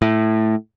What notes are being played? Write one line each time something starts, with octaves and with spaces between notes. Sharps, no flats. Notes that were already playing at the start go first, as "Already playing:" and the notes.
A2